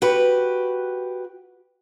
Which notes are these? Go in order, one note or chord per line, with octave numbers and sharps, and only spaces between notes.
F#4 G4 B4